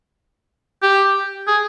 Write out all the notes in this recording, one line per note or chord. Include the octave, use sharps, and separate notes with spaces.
G4
G#4